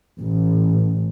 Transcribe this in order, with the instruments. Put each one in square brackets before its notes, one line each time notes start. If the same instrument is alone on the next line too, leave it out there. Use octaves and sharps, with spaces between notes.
[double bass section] A1